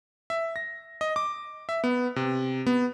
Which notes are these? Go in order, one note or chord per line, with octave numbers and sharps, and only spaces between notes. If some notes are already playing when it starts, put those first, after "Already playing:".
E5
A#6
D#5
D6
E5
B3
C3
B3